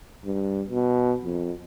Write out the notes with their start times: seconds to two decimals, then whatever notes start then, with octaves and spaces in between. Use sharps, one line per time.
0.25 G2
0.69 B2
1.25 F2